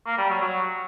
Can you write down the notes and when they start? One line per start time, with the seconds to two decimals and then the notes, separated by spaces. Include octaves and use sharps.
0.06 A#3
0.18 G3
0.30 F#3
0.41 F#3